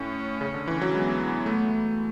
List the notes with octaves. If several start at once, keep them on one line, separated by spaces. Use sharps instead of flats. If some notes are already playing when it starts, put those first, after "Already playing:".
Already playing: A2 C#4
C#3
D3
E3
F#3
G#3 B3
A3